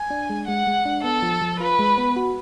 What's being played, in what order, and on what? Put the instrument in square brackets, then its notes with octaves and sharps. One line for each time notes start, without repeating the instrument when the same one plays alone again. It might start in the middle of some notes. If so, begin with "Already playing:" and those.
Already playing: [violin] G#5
[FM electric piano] D4
G#3
[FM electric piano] G#3 [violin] F#5
[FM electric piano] G#3
D4
[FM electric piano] B3 [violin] A4
[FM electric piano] F3
F3
[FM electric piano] F4 [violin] B4
[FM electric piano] G#3
B3
F#4